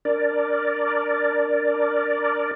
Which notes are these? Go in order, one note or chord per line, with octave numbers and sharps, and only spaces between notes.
D4 A#4 D5